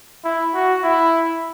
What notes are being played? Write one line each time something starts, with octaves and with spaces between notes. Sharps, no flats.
E4
F#4
E4